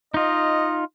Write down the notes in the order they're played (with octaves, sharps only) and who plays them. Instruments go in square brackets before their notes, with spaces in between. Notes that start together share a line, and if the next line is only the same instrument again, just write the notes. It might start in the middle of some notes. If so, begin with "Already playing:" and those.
[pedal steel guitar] D#4 F4 [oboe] D#5